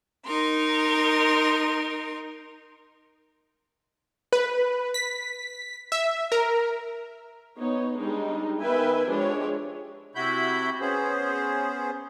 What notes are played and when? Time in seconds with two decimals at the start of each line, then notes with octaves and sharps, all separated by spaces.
0.25 D#4 A#4 C6
4.33 B4
4.94 B6
5.92 E5
6.32 A#4
7.58 B3 D#4 C#5
7.98 G3 G#3 D4 D#4
8.60 D#3 B3 B4 E5 G5 G#5
9.08 F3 G#3 D4 G4 C#5
10.15 C3 E4 F#4 B5 G6
10.80 B3 C#4 G#4 C5